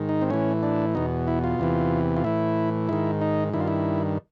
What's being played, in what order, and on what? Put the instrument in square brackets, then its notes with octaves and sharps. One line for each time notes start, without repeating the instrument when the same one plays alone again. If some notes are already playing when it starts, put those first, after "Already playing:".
Already playing: [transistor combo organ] G#2 D#3
D#4
C4
A2 E3 C#4
D4
E2 B2 D#4
E4
F4
E2 C3 E3
F4
A2 E3 E4
G#2 D#3 E4
D#4
G2 D#3 E4
F4
E4